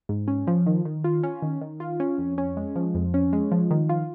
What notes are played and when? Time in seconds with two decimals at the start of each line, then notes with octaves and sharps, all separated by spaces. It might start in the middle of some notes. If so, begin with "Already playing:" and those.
0.09 G#2
0.28 C#4
0.47 F3
0.66 D#3
0.85 D#3
1.04 F4
1.23 C#4
1.42 D#3
1.61 D#3
1.80 F4
2.00 C#4
2.18 F2
2.38 C#4
2.57 G#3
2.76 F3
2.95 F2
3.14 C#4
3.33 G#3
3.51 F3
3.71 D#3
3.89 F4